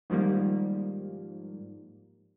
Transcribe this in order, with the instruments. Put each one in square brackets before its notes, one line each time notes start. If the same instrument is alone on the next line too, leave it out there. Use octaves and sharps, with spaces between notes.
[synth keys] G#2 D#3 F3 G3 A#3